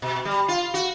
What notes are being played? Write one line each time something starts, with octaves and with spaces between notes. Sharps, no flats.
B2
G3
F4
F#4